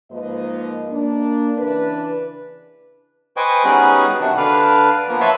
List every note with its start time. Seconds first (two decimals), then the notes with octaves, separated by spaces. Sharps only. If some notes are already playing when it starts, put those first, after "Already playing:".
0.11 G#2 F3 A#3 B4 D#5
0.90 A#3 D4
1.58 C#3 E3 D4 B4
3.37 B4 C5 D#5 G5 G#5 C#6
3.64 G3 B3 C#4 D#4 F#4 G#4
4.20 C3 D#3 D4 F#4
4.38 D3 D4 B4 D5 F5 F6
5.09 F3 A#3 B3
5.21 B4 C#5 E5 A5 B5 C6